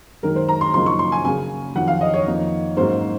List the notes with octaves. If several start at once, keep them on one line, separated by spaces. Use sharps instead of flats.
F#2 D#3 G#3 A#4
C5
A#5
C6
F#2 C#3 F3 A#3 D#4 C6
C#6
C6
G#5
C#3 F#3 A#3 G#5
F2 D#3 F#3 F#5
F5
D#5
C#5
F2 D#3 A#3 D#4
G#2 F#3 A#3 C#4 C5